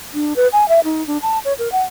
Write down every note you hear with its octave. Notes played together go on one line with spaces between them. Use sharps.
D4
B4
G#5
E5
D#4
D4
A5
C#5
A#4
F#5